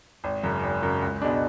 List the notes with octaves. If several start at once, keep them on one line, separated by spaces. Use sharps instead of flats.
G#1
F#2 C#3
G#1
F#2 C#3
C#2
B2 G#3 D4